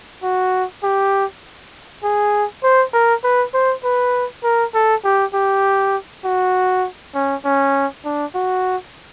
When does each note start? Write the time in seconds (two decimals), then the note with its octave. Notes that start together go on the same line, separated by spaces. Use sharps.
0.23 F#4
0.83 G4
2.03 G#4
2.63 C5
2.94 A#4
3.24 B4
3.54 C5
3.84 B4
4.44 A#4
4.74 A4
5.04 G4
5.34 G4
6.25 F#4
7.15 C#4
7.45 C#4
8.05 D4
8.35 F#4